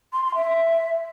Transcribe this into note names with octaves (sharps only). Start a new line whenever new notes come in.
C6
C6
E5